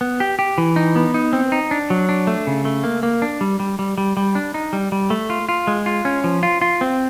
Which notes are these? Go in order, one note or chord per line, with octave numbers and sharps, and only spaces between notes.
B3
G4
G4
E3
D#4
B3
D#4
C4
D#4
D4
F#3
D4
A3
C#3
A3
A#3
A#3
D4
G3
G3
G3
G3
G3
D4
D#4
G3
G3
A3
F4
F4
G#3
F4
C#4
F3
F4
F4
C4